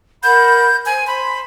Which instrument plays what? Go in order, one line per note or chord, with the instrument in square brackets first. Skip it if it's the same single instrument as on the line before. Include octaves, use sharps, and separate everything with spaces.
[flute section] A#4 F#5 B5 [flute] G6
[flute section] C5 [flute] G#5
[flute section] C5 C6 [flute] B5